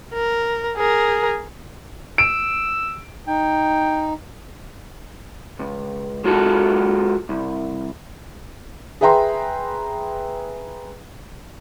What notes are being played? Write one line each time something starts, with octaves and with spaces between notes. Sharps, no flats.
A#4
G#4 A#4
E6 D7
D#4 G5
C#2
G#3 F4 F#4 A4
C2
G#4 B4 E5 G5 A#5 C6